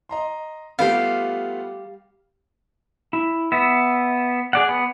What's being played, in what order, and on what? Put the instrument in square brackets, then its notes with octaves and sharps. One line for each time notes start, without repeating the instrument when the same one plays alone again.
[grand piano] D#5 A#5 C6
[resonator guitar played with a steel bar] G3 G4 [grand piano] A3 B3 F4 [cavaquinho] F5
[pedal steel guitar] E4
B3 E5
G#4 D5 F#5
B3